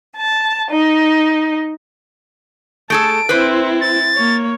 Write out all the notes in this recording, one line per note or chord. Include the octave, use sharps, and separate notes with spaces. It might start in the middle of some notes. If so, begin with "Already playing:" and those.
A5
D#4
A3 G#4 A4 A5 D7
C4 E4 B4 C5
A6
A#3 C#5